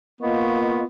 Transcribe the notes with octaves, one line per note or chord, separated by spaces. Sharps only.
A#3 B3 F4 D#5 C#6